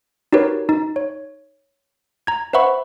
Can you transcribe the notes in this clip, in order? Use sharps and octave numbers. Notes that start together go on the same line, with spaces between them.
D#4 F#4 G4 A#4 B4 C#5
D#4
C#5
A#5 G#6
B4 C5 E5 F#5 B5 C#6